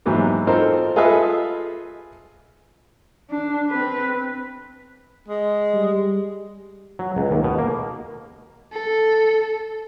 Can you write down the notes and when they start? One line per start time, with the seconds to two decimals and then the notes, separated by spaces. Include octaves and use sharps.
0.06 G#2 E3 F#3 A#3 B3 G4
0.47 C4 D#4 F4 A4 A#4 C5
0.96 F4 G#4 A4 B4 D#5 E5
3.30 D4
3.69 C4 B4
5.28 G#3
5.74 G3
6.99 F#3
7.16 C#2
7.31 D#2
7.44 B2
7.58 A#3
8.72 A4